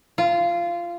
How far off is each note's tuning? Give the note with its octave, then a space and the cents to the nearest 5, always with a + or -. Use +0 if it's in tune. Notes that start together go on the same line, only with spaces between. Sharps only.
F4 -15